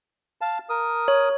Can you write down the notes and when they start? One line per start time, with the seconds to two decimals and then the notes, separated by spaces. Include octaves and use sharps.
0.41 F5 A5
0.69 A#4 D#6
1.08 C#5